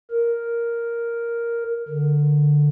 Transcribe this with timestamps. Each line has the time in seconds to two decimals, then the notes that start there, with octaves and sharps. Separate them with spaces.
0.11 A#4
1.88 D3